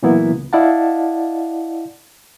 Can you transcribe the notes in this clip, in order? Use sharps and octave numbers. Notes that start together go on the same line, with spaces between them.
A#2 E3 F#3 A#3 B3 E4
C#2
E4 D5 D#5 F5 F#5 A5